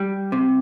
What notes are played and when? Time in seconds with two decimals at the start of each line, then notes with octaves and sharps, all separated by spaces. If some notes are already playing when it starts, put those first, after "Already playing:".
Already playing: G3
0.32 C3